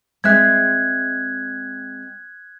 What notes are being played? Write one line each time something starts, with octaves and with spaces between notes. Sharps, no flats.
G#3 C4 E5 F#6 G#6